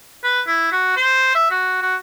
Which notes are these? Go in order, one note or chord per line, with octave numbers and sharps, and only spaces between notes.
B4
E4
F#4
C5
E5
F#4
F#4